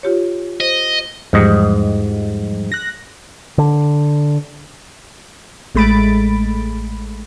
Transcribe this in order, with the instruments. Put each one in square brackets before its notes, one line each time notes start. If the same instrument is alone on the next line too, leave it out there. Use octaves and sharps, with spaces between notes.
[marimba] F4 G4 C#5
[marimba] C5 [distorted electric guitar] D#5
[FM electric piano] E2 F3 G3 [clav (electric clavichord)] G#2 D#5
[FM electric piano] F#6 A#6
[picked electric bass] D3
[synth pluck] A1 G#3 A3 B5 A6 D7